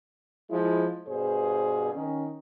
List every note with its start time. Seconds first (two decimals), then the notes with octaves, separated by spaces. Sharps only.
0.51 F3 G#3 E4
1.08 G2 B2 G#4 C5
1.94 D#3 C#4